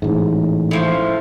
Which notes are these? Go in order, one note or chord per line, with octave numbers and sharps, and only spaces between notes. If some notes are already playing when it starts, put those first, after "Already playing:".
A1 G#2
A2 F3